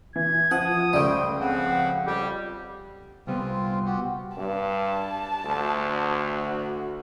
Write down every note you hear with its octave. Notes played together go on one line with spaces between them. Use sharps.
E3 G#6
F3 F#5 D#6
C#2 G3 A3 C5 G5
C#3 F3 C4 F#5
F2 G3 G4
C2 G3 B3 C4 F4
F#4 G4
G2 A5
D2
F#4